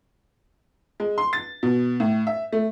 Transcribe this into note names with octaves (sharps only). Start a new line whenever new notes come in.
G#3
C6
A6
B2
A2
E5
A3